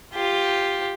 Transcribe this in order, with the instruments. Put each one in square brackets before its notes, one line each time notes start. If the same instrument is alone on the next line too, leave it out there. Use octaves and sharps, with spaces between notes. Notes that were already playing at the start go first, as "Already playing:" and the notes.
[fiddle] F4 G4